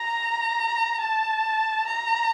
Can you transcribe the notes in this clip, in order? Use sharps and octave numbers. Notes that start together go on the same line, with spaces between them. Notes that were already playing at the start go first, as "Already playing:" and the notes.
Already playing: A#5
A5
A#5